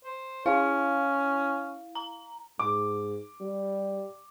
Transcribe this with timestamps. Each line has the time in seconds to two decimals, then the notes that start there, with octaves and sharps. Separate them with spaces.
0.04 C5
0.46 C#4 E4 F5
1.95 A#5
2.59 G#2 D6
3.40 G3